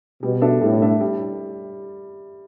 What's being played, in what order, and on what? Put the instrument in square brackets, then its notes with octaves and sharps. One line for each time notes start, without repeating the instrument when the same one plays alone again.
[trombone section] B2 [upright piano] G3
[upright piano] D4 A4 E5
[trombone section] A2 [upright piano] G3
[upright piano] D4 A4 E5
G3